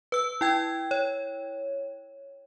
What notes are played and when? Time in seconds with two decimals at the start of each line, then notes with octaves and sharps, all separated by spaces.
0.12 B4 E6
0.41 E4 G5 G#6
0.91 C#5